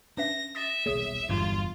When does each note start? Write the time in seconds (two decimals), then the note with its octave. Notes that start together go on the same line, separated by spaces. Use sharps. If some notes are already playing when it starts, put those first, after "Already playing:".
0.17 C#4 D4 B4 E5 A#6
0.55 E5 D#6 A6 A#6
0.86 D#1 B1 A#3 G#4 C#5 D#6
1.29 G1 E2 G2 F#3 F4